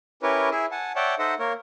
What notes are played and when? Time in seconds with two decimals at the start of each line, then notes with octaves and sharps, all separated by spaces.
0.23 C#4 E4 G4 A#4 B4 C#5
0.51 E4 G#4 E5
0.71 F#5 G#5 A5
0.96 C#5 D5 E5 F#5 G5 A5
1.19 D#4 A4 C5 D#5 E5 F#5
1.39 A#3 A#4 C#5